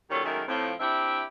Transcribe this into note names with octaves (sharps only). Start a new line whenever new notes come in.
A#2 D#3 F#3 C#4 G4 A4
F#2 D#3 G#3 A3 G#4 A#4
A2 F3 C4
C4 D4 E4 G4 E5